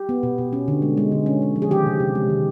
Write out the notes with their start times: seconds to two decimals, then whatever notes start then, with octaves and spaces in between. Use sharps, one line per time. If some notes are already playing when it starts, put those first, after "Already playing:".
Already playing: G4
0.09 B3
0.23 B2
0.38 B2
0.53 C#4
0.68 D3
0.82 G#3
0.97 G#3
1.12 D3
1.26 C#4
1.42 G#3
1.56 F3
1.62 G#4
1.71 D#3 G4
1.86 C3
2.00 C3
2.15 G#3
2.29 D#3